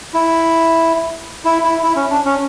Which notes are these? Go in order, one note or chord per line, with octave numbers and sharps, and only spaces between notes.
E4
E4
E4
E4
C#4
D4
C#4